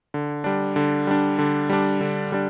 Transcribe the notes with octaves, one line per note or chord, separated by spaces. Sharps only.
D3
G3 D4
D3
G3 D4
D3
G3 D4
D3
G3 D4